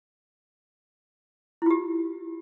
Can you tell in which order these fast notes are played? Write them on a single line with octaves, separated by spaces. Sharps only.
E4 F4 G4